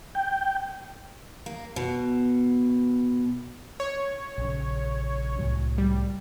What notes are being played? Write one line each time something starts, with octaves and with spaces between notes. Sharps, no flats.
G5
A#3
B2
C#5
A#1 C#3
C2 A2 F#3
G3